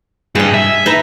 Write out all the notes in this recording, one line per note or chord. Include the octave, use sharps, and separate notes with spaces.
G2 G#4 D#5
E5
D#4 B4 A#5